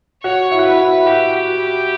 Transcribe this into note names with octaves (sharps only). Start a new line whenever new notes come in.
F#4 C#5
E4
F#4
E4 B4
E4
F#4 G4